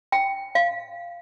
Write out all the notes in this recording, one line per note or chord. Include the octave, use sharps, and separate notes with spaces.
G5
F5